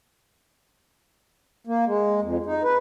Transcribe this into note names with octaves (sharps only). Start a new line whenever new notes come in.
A#3
G#3
F2
D#4
B4